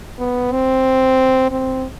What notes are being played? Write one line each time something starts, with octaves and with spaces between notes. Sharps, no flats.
B3
C4
C4